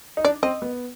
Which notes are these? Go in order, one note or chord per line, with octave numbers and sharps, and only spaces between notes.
D#4
D4 D5
C4 D#5
B3